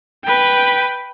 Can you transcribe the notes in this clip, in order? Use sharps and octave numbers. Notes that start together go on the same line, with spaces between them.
B4 G5